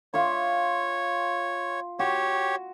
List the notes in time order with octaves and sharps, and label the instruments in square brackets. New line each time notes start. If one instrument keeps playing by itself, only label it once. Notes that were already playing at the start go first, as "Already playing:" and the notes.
[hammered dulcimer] F4 E5 D6 [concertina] C#5
[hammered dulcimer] F#4 [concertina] G4 C#5